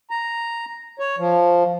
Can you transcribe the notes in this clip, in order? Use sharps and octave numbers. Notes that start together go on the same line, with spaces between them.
A#5
C#5
F3